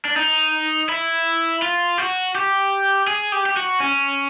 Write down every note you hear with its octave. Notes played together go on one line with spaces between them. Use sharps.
D4
D#4
E4
F4
F#4
G4
G#4
G4
G4
F#4
C#4